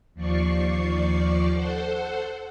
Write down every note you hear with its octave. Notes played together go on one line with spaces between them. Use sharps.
D#2 F3 D5 C#6 C7
A4 C5 F#5